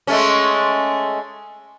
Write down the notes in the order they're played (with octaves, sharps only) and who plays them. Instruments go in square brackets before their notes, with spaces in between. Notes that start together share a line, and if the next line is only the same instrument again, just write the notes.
[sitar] G#3 A3 C#4